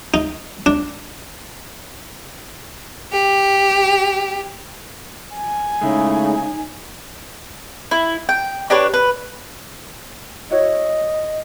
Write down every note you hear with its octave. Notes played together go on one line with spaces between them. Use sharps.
D#4
D4
G4
G#5
C#3 G#3 A3 D#4 E4
E4
G5
D4 G4 B4 C#5
B4
E4 F#4 C#5 D#5